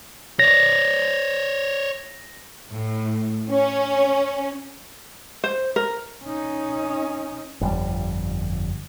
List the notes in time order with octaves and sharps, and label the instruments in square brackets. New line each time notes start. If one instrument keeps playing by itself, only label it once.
[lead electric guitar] C#5 D5 [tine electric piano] A#6
[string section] A2
C#4
[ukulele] C5
A#4
[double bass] C#4 D#4
[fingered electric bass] G1 F2 G3